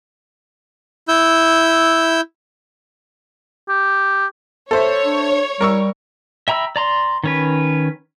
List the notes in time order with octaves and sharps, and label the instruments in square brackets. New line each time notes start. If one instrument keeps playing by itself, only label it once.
[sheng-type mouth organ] E4 E6 G6
[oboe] G4
[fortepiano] A4 C5 E5 [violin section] C#5
[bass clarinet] D4
[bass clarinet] G3 [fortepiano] A#4 C#6 E6
[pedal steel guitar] E5 G5 A#5 B5 E6
D5 A#5 C6
D#3 C#4 B4